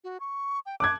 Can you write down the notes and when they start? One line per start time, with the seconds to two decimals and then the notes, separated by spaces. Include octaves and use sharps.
0.04 F#4
0.20 C#6
0.66 G5
0.80 A5 D6 F#6 G#6